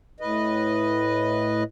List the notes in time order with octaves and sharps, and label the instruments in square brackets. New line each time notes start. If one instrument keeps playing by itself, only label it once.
[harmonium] A2 B4 D#5